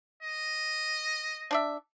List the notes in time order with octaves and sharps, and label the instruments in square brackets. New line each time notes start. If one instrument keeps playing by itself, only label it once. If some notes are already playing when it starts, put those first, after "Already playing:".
[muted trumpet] D#5
[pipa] D4 D5 E5